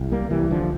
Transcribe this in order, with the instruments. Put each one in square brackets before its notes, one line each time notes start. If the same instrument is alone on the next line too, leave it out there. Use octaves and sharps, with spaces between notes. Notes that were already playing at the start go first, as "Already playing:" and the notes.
Already playing: [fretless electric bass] C2
G3 A#3
C2 E3 G3
D3 F3